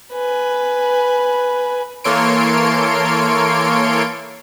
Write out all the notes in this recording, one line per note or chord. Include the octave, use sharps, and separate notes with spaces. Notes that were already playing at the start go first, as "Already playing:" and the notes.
B4 G#5
E3 A#3 A4 C#5 C6 D7